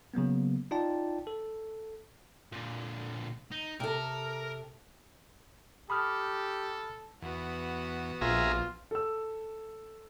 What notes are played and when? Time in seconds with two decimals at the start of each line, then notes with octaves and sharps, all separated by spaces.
0.14 C#3 F#3 A#3 B3
0.71 D#4 F4 D5 G5 A5
1.27 A4
2.52 A#2 D3
3.52 D#4
3.80 C3 A4 A#4
5.90 G4 A4 B5 D#6 F6
7.22 E2 B3 F#4
8.21 A#1 F4 G#4 E5 A#5
8.91 A4 E6